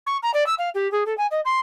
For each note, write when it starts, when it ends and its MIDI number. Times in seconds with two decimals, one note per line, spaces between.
0.07 0.17 85
0.23 0.31 82
0.34 0.46 74
0.47 0.55 88
0.59 0.70 77
0.75 0.90 67
0.92 1.04 68
1.06 1.16 69
1.18 1.27 80
1.31 1.41 75
1.45 1.60 84